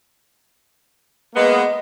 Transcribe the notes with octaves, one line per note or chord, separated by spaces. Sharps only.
G#3 A#3 B3 D#5